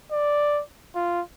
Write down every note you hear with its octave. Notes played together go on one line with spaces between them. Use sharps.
D5
F4